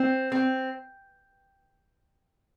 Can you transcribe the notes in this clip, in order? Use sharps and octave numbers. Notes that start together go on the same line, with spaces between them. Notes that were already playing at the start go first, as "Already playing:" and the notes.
Already playing: C4
C4